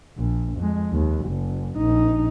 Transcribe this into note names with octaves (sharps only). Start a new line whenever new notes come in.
A#1
F2 G#3
D#2
F#1
A#1 D#4